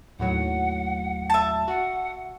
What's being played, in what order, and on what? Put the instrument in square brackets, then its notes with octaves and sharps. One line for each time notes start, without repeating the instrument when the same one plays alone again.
[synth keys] D#2 A2 F#3 [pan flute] F#5
[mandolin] E5 A5
[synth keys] F#4 [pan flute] F#5